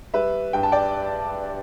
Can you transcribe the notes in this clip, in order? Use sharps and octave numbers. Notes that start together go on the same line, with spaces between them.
G3 B4 E5
G2 G5
A5
D5 G5